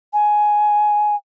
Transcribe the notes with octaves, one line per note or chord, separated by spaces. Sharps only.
G#5